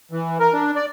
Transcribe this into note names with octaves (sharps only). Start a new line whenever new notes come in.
E3
A#4
D4
D5